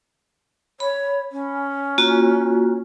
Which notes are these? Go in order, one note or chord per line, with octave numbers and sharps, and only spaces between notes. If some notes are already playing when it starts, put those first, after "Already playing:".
C#5 B5
C#4
A#3 F4 F#4